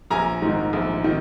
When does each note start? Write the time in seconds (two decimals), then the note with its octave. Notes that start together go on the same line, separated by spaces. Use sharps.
0.10 A#1 G#5 A#5
0.42 G#2 D#3
0.73 A#1
1.04 D#3